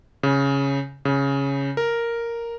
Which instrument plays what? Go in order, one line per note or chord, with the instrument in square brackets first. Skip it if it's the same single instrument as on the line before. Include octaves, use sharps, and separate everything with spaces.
[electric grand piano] C#3
C#3
A#4